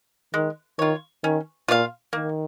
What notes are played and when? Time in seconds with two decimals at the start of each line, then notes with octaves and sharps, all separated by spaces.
0.34 D#3 G#3
0.79 D#3 F4 C#5
1.24 D#3 C#4
1.68 A#2 F4 C#5 F5
2.13 D#3 A#3